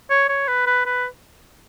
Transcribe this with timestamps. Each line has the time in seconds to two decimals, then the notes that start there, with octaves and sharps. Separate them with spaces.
0.10 C#5
0.29 C#5
0.48 B4
0.67 B4
0.86 B4